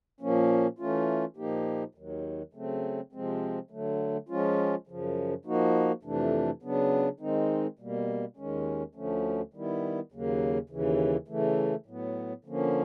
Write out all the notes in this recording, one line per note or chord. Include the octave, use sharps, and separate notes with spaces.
A#2 F3 A#3 C#4
E3 A3 C#4 F4
A#2 F3 A#3 D#4 G4
D#2 D#3 F#3
C#3 F#3 A3 C4
C3 F3 G#3 C4
D3 F#3 A3
F3 G#3 C#4 F4
F#2 C#3 F3
F3 A#3 D#4 F#4
F2 C3 E3 A3 D4
C#3 F#3 B3 D4
D#3 G#3 C4 D#4
B2 G3 A#3
D#2 D#3 G#3 C#4
D2 D3 F3 A3 C#4
D#3 G3 B3 E4
D#2 C#3 F#3 A#3
D#2 C#3 E3
C#3 E3 A3
A2 F#3 B3
D3 F3 A#3 C#4